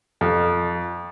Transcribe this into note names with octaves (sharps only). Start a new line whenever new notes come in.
F2